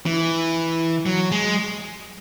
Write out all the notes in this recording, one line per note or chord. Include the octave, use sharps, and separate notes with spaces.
E3
F#3
G#3